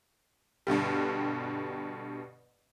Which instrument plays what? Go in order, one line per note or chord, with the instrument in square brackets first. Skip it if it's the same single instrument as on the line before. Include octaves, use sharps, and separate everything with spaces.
[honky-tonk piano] G2 B2 D3 G3